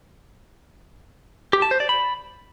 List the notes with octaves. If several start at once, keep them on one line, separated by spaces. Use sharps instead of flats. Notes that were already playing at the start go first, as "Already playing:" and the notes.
G4
A5
C5
D5
B5